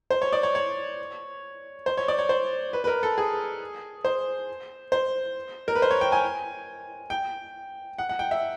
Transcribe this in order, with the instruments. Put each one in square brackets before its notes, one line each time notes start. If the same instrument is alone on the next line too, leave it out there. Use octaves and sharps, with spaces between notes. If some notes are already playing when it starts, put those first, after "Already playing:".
[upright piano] C5
C#5
D5
C#5
C#5
C5
C#5
D5
C#5
C5
B4
B4
A#4
A4
G#4
C5
C5
A#4
B4
C5
C#5
G5
G#5
G5
F#5
F#5
G5
E5